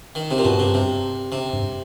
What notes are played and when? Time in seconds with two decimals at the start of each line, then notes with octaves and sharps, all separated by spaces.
0.15 D#3
0.31 C3
0.38 A#2
0.45 G2 B2
0.59 C3
0.74 C3
1.32 C3
1.53 G2